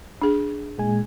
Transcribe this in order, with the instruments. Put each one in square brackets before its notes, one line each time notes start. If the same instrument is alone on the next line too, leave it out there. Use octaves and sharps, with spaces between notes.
[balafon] D4 G#4
[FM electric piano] A#2 G#3 G#5